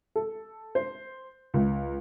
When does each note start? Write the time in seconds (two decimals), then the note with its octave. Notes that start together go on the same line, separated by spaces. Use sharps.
0.16 A4
0.75 C5
1.54 C#2